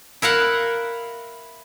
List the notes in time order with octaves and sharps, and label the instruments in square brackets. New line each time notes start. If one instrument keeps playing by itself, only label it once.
[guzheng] E4 A#4 F5 F#5